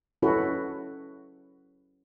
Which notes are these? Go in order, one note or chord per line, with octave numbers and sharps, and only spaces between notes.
C#4 E4 F#4 A4 B4